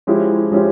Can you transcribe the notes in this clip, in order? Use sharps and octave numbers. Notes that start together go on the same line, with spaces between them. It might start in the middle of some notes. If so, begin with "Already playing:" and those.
F3 G#3 C#4 E4 G4
F3 G#3 C#4 E4 G4